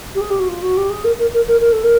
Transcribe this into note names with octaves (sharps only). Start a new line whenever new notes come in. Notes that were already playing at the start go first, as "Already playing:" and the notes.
G4
G#4
G4
F#4
F4
F#4
G4
G#4
A#4
A#4
A#4
A#4
A#4
A4
A#4